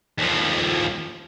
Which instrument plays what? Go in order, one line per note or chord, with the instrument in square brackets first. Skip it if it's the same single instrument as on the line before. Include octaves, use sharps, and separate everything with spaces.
[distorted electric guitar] D#2 F3